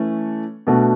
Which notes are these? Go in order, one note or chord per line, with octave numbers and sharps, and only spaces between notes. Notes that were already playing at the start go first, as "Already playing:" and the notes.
Already playing: E3 A3 C#4
B2 A3 D4 F#4